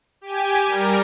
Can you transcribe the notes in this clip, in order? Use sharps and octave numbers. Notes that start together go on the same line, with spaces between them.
G4 G#5
G3 A#4